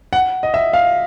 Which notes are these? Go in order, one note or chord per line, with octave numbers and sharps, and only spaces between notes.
F#5
D#5
E5
F5